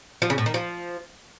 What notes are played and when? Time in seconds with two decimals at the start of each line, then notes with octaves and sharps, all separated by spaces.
0.22 F3
0.30 C#3
0.38 A2
0.46 D#3
0.54 F3